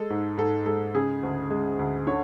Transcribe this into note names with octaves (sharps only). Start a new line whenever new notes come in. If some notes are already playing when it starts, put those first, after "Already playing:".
Already playing: G#3 A4
G#2
G#2 A4
G#3 A4
C#3 G#4
D2
G#3
D2
D3 C#5